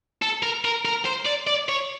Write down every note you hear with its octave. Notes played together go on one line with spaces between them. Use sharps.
A4
A#4
A#4
A#4
C5
D5
D5
C#5